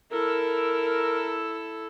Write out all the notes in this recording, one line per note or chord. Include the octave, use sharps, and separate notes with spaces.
E4 A4 A#4